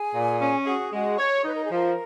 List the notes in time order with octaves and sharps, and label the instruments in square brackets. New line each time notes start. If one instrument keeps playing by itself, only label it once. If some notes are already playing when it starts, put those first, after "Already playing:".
Already playing: [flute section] G#4 G#5
[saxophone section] A#2
C#4
[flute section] F5
[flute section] F#4 F#5 [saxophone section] G#4
[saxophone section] G#3 [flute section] F#4 F#5
[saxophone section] C#5
[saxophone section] D#4 [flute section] B4
[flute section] A#4
G#4
[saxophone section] F3 [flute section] A#4